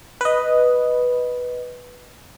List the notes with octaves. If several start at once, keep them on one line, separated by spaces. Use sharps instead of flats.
B4 D#5